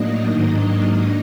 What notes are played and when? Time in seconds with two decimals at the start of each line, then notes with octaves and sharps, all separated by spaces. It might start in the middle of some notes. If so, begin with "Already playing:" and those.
Already playing: A2 F#3 A#3 D4 D#4 D#5
0.31 G#2 D#3 F#3 A#3 D4